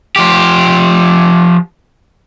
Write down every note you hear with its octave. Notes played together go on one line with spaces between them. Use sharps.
F3 G4